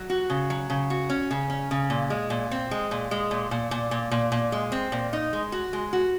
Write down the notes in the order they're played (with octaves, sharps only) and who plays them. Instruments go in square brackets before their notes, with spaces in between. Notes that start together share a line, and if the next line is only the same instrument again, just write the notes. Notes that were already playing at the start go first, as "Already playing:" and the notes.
Already playing: [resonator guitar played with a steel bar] F#3
F#4
C#3
F#3
C#3
F#4
C#4
C#3
C#4
C#3
A#2
G#3
A#2
C4
G#3
A#2
G#3
A#2
A#2
A#2
A#2
A#2
A#2
G#3
C4
A#2
D#4
G#3
F#4
G#3
F#4